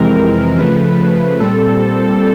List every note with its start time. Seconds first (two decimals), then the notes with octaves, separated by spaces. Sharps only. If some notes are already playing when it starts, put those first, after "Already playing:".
Already playing: F2 C3 E3 G#3 C4 A#4
0.59 C#3 F3 A3 B4
1.40 A#2 G3 C4 A4